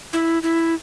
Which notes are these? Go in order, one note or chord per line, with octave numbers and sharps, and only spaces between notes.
E4
E4